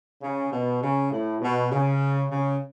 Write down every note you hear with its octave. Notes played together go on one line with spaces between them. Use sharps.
C#3
B2
C#3
A2
B2
C#3
C#3